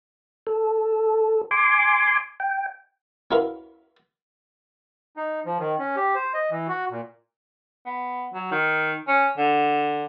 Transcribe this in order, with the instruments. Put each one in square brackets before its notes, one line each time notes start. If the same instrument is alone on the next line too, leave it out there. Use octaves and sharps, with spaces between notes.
[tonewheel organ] A4
G#5 C6 D6
G5
[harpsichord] C#4 E4 F#4 A#4 B4 F5
[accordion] D#4
F3
D#3
C#4
G4
C5
D#5
E3
F#4
A#2
[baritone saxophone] B3
F#3
D#3
C#4
D3